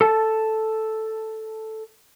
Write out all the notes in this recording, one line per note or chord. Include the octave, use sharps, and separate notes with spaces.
A4 A5